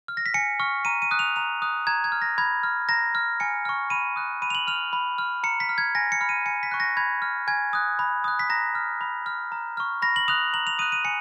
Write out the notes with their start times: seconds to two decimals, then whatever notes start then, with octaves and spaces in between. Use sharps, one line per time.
0.08 F6
0.17 A#6
0.26 B6
0.34 G#5 C#7
0.60 C#6 F6
0.85 A#5 D#7
1.02 D#7
1.11 D#6 F#6
1.19 F7
1.36 A#5 F7
1.62 D#6 F#6
1.87 A#5 G#6
2.04 G#6
2.12 F6
2.22 A#6
2.38 B5 G#6
2.63 F6
2.89 A#5 A#6
3.15 F6
3.40 G#5 C#7
3.65 C#6 F6
3.90 B5 D#7
4.16 D#6 F#6
4.42 B5 D#7
4.50 F7
4.55 F#7
4.67 F6 F7
4.93 B5
5.18 F6
5.43 A#5 C#7
5.60 B6
5.69 F6
5.78 G#6
5.95 G#5 A#6
6.12 C#7
6.21 B5 F6
6.29 D#7
6.46 G#5 C#7
6.63 B6
6.71 C#6 F#6
6.80 A#6
6.97 B5 G#6
7.22 F6
7.47 G#5 G#6
7.73 D#6 F#6
7.99 B5
8.24 D#6 F#6
8.39 B6
8.50 A#5 A#6
8.75 F6
9.01 B5
9.26 F6
9.52 A#5
9.77 C#6 F6
10.02 B5 A#6
10.16 F#7
10.28 D#6 F#6 F7
10.54 A#5 F#7
10.67 F7
10.79 D#6 D#7
10.82 F#6
10.92 D#7
11.05 G#5 C#7